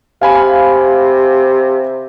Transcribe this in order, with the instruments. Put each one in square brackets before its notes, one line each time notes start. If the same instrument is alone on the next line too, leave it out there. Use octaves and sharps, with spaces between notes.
[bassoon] C3 [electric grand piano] F5 G#5 B5